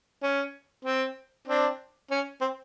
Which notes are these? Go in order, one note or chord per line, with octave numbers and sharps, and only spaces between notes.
C#4
C4
C4 D4
C#4
C4